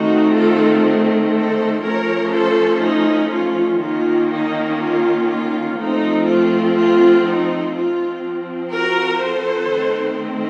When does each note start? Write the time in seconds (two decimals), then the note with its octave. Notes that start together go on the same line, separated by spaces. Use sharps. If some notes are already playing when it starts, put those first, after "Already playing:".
Already playing: D#3 A3 C4 D#4 F#4
0.34 F4 A4
1.33 A4 C5
1.82 F3 A3 C#4 A#4 C#5
2.31 A4 C5
2.81 D#4
3.30 F4
3.80 D#3 A#3 C#4 F4
4.29 D#4
4.79 F4
5.27 F4
5.76 F3 A3 C4 D#4
6.26 F4
6.76 F4
7.25 D#4
7.74 F3 C4 F4
8.73 F#4 A#4
9.22 A4 C5
9.71 D#3 A3 C4